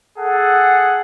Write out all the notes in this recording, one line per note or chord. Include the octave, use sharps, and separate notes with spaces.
G#4 A4 F#5